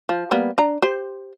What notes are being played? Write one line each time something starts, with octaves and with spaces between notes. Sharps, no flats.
F3
G3 A#3 B3
D4 A#5
G4 C5